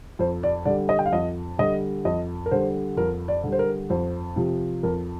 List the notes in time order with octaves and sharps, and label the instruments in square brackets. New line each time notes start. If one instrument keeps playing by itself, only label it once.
[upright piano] F2 C5
D5
D3 G3 D5
D#5
G5
F5
F2 D#5
D3 G3 D#5
F2 D#5
A#4
D3 G3 C5
F2 A#4
D5
D3 G3
C5
A#4
F2 C5
C3 F3
F2 A#4